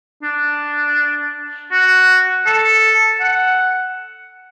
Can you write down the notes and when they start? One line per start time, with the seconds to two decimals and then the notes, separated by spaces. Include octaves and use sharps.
0.23 D4
1.71 F#4
2.46 A4
3.20 F#5